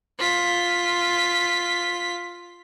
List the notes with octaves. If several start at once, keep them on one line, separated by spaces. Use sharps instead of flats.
F4 B6